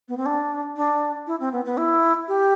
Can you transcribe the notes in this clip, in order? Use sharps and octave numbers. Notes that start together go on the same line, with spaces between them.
B3
C4
D4
D4
E4
C4
B3
B3
E4
G4